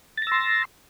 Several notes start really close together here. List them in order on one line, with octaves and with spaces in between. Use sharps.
A6 A#6 E6 C6